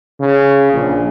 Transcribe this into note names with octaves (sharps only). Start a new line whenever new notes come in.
C#3
A#1